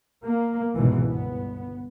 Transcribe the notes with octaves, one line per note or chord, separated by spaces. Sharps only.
A#3
F1 C#2 G#2 B2 E3
G1 B3